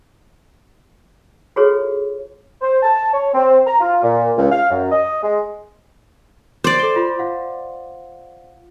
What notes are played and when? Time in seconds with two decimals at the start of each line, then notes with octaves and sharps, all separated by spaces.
1.56 F4 F#4 G#4 A4 B4 C#5
2.62 C5
2.83 A5
3.13 C#5
3.34 C4
3.67 A#5
3.81 F4
4.02 A#2
4.37 C#2
4.52 F5
4.70 F#2
4.92 D#5
5.23 G#3
6.64 C5 D5 D6
6.79 A4 G7
6.96 F4 B5
7.19 F4 F5 F#5